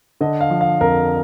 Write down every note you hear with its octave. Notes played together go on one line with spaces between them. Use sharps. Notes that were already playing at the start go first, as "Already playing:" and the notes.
D3 D#5
F5
F3
F5
F2 A#4